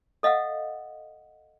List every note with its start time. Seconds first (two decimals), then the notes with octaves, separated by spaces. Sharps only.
0.23 A4 D#5 F5 F#5 E6